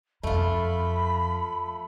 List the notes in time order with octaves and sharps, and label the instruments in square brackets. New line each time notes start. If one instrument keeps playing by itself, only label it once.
[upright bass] F2 [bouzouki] A3 F4 [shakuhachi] B5